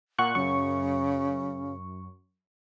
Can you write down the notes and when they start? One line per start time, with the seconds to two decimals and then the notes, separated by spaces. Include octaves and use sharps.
0.19 A#2 F#5 C#6 F#6
0.35 F#2 C#3 C#6